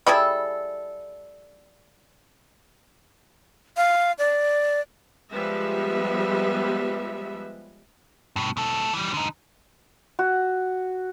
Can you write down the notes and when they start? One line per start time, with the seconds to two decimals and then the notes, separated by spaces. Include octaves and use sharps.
0.07 G3 E4 G#4 A4
3.77 F5
4.19 D5
5.32 F3 G3 G#3 B3 B4 E5
8.36 G2 B2
8.57 B2 A4
8.93 E3 G3
9.14 D3 D#4
10.19 F#4